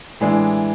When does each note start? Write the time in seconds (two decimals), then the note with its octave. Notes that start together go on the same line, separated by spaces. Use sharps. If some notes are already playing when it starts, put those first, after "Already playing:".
0.20 A2 E3 G#3 D4